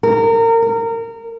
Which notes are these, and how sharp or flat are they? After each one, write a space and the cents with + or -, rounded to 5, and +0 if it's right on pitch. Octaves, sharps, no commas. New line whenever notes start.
A#4 -30
A#4 -25